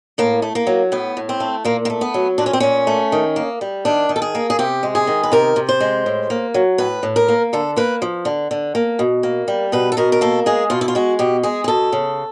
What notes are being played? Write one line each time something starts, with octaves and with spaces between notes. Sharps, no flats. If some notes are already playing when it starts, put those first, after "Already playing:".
A2 A#3
A3
A#3
F#3
A2 B3
A2
C4
A3
A#2 A#3
A#3
A3
B3
F#3
A#2 D4
C#4
C4
A#2 C#4
A3
D#3
A#3
G3
D#3 D4
D#3
A4
G#4
A#3
G#4
C3 G4
G#3
G#4
D#3
B4
C3 A#4
C3
C5
G#3
A2
A#3
F#3
A2 B4
A2
A#4
A#3
D3 A4
A#3 B4
F3
D3
D3
A#3
B2
A#3
G3
B2 B4
A4
B2 A#4
A#4
A#3 A4
G#3 G#4
B2 F4
E4
F4
G#3 F#4
B2 G4
G#3 G#4
G#4
B2 A4
C#3